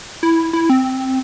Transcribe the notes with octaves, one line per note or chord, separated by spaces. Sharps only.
E4
E4
C4